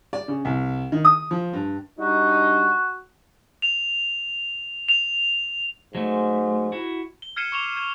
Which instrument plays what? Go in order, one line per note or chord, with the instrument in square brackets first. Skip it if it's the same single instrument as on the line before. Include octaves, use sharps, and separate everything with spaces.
[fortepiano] D5
C#3
C2
D#3
D#6
F3
G2
[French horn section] G3 D4 D#4 [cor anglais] F#4
[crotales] F7
F7
[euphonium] G#2 [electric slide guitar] F#3 A3
[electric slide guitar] E4 F#4
[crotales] G7
F6 G#6 C7 C#7 D#7 E7
C#6 D6 E7 F7 G7
G#6